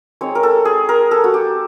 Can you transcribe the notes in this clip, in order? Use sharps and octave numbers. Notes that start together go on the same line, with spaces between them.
G#3 C4 D#4 C#5
A#4
A4
G#4
A#4
A4
F#4
G4